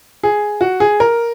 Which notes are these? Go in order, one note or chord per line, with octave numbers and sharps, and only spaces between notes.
G#4
F#4
G#4
A#4